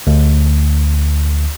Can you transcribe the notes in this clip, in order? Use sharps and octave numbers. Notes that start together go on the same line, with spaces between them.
D2